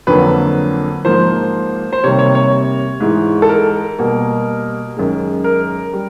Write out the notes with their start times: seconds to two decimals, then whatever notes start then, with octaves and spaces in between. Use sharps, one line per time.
0.07 F2 D3 F#3 A#3 B4
1.05 G#2 F3 A#3 C5
1.93 C5
2.03 C3 D#3 G3 A#3 C#5
2.19 C#5
2.35 C#5
3.00 G#2 E3 G#3
3.42 A4
3.49 A#4
3.98 B2 G3 A#3
4.97 F#2 D#3 G#3
5.44 A#4
5.93 G3